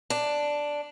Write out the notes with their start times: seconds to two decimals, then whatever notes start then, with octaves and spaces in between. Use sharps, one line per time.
0.10 D4